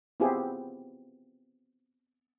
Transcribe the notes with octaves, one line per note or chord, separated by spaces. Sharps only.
B3 C4 E4 F4 G4 G#4